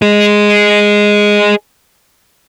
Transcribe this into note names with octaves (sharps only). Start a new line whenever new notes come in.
G#4 D#5